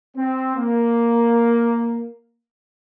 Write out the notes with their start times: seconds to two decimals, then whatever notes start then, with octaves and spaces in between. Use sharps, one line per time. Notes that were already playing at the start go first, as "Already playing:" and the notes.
0.16 C4
0.57 A#3